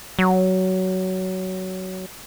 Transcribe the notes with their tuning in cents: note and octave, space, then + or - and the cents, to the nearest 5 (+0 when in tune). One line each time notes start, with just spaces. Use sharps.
F#3 +15